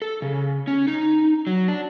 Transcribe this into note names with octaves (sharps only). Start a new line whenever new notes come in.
A4
C#3
C#4
D#4
F#3
D4